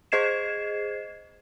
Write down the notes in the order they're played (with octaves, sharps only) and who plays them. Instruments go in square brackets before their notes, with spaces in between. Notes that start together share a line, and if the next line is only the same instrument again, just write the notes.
[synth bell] G#4 C5 D#5 G#6 C7 E7